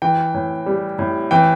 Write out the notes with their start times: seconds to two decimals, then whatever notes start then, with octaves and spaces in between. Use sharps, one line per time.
0.02 E3 G5
0.34 A2
0.66 G3
0.99 A2
1.31 E3 G5